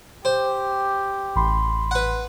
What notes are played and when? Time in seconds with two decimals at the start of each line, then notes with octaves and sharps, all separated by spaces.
0.25 G4 C5
1.36 A1 B5 C6
1.91 B4 F#5